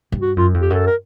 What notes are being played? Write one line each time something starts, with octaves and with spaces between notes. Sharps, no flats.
G2
F#4
F#2 F4
F2
G4
F#2 A4
A#4